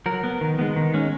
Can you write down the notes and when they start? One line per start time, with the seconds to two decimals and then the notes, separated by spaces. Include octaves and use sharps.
0.06 F#3 A#4
0.24 B3
0.41 D#3
0.59 G#3 B3
0.76 D#3
0.94 G#3 C#4